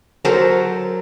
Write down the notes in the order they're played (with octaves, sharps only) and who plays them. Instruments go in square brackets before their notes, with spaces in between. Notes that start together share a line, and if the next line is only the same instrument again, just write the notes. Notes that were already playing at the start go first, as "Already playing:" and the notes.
[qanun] F#3 A4 A#4 C5